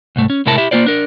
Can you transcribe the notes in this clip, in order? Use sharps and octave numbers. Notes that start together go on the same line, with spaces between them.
C2 G#2 A3
C#4
A2 C3 G#3 E4 A#4 A5
E4 G4 E5
A#3 B3 F4 C5 D5
D4 A#4